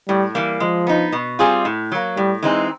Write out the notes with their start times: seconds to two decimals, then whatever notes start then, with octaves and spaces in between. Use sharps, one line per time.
0.08 A2 G3
0.35 E3 G3 A#3
0.60 F3 G#3
0.87 B3 D#4
1.12 B2
1.39 G3 C4 F4 G#4
1.65 A2
1.92 F#3 A#3
2.17 A2 G3
2.43 E3 G#3 C4 D#4